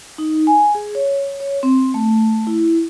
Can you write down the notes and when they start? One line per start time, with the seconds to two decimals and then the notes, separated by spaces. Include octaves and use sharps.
0.18 D#4
0.47 G#5
0.75 G#4
0.95 C#5
1.40 C#5
1.63 C4
1.94 A3
2.47 E4